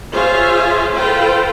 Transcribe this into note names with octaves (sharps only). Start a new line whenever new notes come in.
F4 G#4 C5 C#5 E5 F5
F4 A4 B4 C5 G5